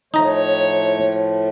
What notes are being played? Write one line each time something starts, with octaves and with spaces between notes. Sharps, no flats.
A2 F3 A3 D#4 C#5 A#5